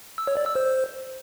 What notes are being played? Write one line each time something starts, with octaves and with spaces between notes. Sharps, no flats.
E6
C#5
D5
E6
C5